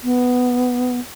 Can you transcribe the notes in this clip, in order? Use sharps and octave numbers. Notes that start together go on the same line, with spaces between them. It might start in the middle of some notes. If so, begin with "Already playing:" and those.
B3